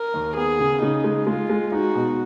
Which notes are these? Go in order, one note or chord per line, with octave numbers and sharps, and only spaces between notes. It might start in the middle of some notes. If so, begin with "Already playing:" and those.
Already playing: A#4
D#2
B3 G#4
C#3
C#3 D#4
G#3
G#3 F4
G#3
D#4 F#4
B2